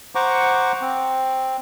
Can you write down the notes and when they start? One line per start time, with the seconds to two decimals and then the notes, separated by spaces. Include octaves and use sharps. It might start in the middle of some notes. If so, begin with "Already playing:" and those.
0.15 C5 F#5 A#5 C#6 D6
0.81 C4